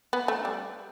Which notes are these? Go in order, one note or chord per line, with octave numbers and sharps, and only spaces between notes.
B3
A3
G3